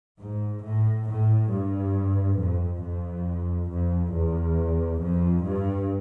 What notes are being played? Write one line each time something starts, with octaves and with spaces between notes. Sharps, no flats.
G#2
A2
A2
G2
F2
F2
F2
E2
F2
G2